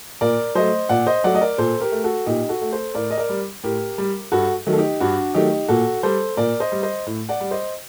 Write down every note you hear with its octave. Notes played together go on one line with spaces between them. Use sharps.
A#2 A#4 D5
F#3 A3 C5 D#5
A#2 D5 F#5
C5 D#5
F#3 A3 D5 F#5
D#5
A#4 D5
A#2 A4 C5
G4 A#4
A3
F#4 A4
A#2 D#4 G4
F#4 A4
A3
A4 C5
A2 A#4 D5
D#5
A#4 D5
G3
A2 G4 A#4
G3
G2 F#4 A4
D#3 F#3 A3
A4
D#4 G4
G2 D4 F#4
D#3 F#3 A3 D#4 G4
A#2 F#4 A4
G3 A4 C5
A#2 A#4 D5
C5 D#5
G3
C5 D#5
A2
D5 F#5
G3
C5 D#5